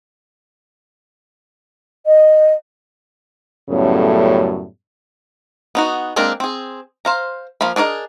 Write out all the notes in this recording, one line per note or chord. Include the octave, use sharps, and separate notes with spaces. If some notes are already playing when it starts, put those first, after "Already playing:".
D#5
F#2 A2 C#3 G3 A3 B3
B3 D#4 F#4
G#3 A#3 C4 D4 A#4
C4 G#4
C5 F5 A#5
F3 A#3 F5 B5
D4 G#4 A#4 D5 D#5